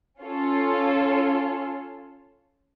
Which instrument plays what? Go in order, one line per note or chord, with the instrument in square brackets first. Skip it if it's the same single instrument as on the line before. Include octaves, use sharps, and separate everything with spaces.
[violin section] C#4 F4 A4 C#5